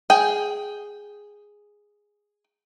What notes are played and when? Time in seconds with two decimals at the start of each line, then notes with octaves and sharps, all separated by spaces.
0.10 G#4 G5